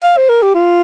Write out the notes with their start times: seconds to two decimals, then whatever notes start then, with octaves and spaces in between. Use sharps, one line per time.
0.03 F5
0.17 C5
0.29 A#4
0.42 G4
0.55 F4